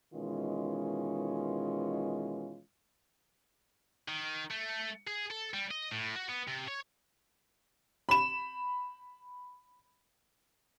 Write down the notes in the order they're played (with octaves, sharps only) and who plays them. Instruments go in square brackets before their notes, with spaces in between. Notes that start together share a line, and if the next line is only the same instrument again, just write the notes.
[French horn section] B2 D#3 E3 G#3 C#4 F4
[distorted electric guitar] D#3
A3
G#4
A4
G3
D#5
A2
F#4
B3
C3
C#5
[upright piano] B5 E7